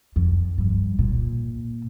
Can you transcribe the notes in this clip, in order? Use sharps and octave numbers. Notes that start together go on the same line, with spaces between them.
F2
G2
A#2